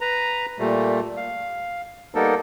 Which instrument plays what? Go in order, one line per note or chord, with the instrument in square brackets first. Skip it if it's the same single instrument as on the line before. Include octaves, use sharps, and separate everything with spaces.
[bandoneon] B4 A#5
A#2 G3 A3
F5
G3 A#3 B3 D#4 A4 A#4